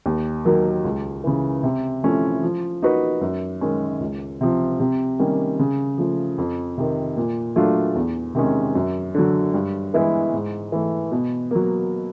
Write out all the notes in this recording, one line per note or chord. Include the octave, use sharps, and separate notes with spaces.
D#2
D#3 F#3 A#3
C#2
C#3 E3
C3
F3 A3 C#4 E4
F3
A#3 D#4 F#4 B4
F#2
D#3 G#3 C#4
C#2
C3 F3
C3
D#3 G3 A#3 C#4
C#3
F3 A3
F2
C3 D#3
A#2
F#3 A3 D4 F4
E2
C3 D#3 G#3 C#4
F#2
D3 F#3
G2
E3 G#3 B3 E4
G#2
E3 A3
B2
F#3 A#3